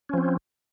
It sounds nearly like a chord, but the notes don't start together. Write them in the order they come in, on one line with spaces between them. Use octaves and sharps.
C#4 F3 C4